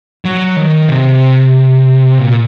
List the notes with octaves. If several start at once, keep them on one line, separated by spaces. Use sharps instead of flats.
F#3
D#3
C3
A#2